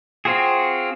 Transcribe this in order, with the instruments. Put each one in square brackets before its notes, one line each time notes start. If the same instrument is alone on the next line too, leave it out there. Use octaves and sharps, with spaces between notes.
[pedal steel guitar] C4 F4 F#4 G#4